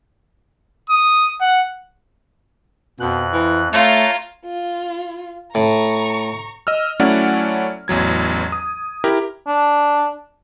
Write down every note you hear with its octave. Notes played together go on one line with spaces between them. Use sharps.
D#6
F#5
F2 B2 F#6
E3
A3 F4 C#5 F5 A5 A#5
F4
A2 A#5 C#6
D#5 E6 F6
F#3 A3 C#4 E4 D5 F#5
A1 E2 F#3 G#6
D#6
E4 G4 A#4
D4